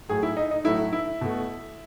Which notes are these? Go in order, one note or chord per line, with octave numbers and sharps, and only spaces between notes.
A2 F#3 A3 G#4
E4
D#4
D#4
A2 F#3 A3 E4
E4
B2 A3